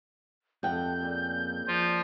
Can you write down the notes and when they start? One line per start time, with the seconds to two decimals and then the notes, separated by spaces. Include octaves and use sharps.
0.63 F2 C3 A4 F#5 G5 G6
1.02 A#2 C#3 A#4
1.68 F3 F4 D5